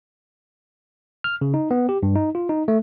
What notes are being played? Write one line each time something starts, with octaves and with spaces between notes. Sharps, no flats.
F6
C#3
D#4
B3
G4
G2
D#4
F4
D#4
A3